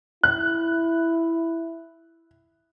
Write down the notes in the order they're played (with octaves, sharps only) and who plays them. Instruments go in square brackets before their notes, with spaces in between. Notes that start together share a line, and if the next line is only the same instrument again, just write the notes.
[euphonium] E4 [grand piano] F#6